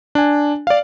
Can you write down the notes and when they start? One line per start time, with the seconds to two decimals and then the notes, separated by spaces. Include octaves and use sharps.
0.15 D4 G#5
0.67 D5 F5